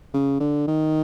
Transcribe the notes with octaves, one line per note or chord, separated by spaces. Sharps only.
C#3
D3
D#3